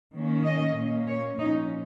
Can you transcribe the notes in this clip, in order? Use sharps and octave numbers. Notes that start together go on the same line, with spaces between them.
D#3 A#3 C#4
D#5
A#2 A#3 C#4
C#5
A#2 F3 C#4 D#4